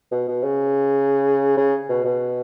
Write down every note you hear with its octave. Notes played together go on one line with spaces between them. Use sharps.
B2
B2
C#3
C#3
B2
B2